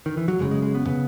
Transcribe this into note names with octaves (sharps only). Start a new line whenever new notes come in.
D#3
E3
F#3
F#1 F#2 C#3 G#3
G#3
G#3
B3
C#3 B3